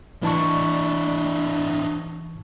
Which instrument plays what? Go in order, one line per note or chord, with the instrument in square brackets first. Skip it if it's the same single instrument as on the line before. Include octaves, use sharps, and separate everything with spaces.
[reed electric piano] E3 A5 C#6 [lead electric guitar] D4 E4